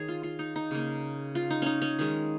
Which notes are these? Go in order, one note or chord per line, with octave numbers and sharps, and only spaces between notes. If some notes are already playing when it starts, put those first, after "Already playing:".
Already playing: D#3 G#4 C#5
F4
F4
D#4
D#4
C#3 A#3
F4
D#4
C#4 D#4
C#4
D#3 G#3